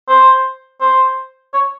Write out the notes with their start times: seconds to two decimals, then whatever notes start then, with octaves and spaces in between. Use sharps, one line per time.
0.09 C5
0.81 C5
1.54 C#5